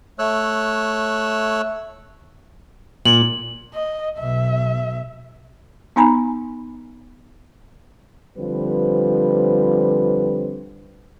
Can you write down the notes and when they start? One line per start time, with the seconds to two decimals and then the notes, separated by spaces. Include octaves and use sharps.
0.19 A3 C#5 E6 F#6
3.05 A#2 F#7
3.74 D#5
4.19 B1 B2 E5
5.96 B3 D#4 G#5 A#5 B5
8.37 D3 F3 G3 C4 B4